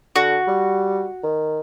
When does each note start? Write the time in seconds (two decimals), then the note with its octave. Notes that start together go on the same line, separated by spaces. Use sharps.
0.16 D3 F#4
0.47 G3
1.23 D#3